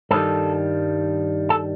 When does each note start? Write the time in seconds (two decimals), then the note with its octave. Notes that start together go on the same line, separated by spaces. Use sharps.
0.11 G2 D#3 G3 A4
1.50 A4